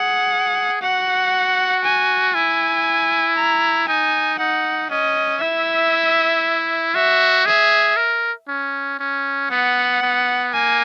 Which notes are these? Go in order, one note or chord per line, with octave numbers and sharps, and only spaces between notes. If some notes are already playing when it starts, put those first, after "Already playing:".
Already playing: G#4 F#5
F#4 F#5
G#5
E4 G#5
A#5
D#4 G#5
D#4 F#5
C#4 D#5
E4 E5
F#4 E5
G#4 E5
A#4
C#4
C#4
B3 F#5
B3
A#3 G#5